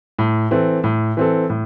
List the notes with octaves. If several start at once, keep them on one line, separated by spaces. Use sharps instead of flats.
A2
E3 C4 A4
A2
E3 C4 A4
A2